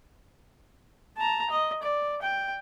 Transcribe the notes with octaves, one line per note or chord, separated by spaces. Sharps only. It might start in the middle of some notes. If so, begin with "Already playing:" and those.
A5 A#5
D#5
D5
G5